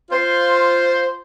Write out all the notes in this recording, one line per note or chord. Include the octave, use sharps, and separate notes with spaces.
F4 C5